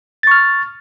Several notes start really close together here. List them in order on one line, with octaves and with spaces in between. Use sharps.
A6 C#6 F6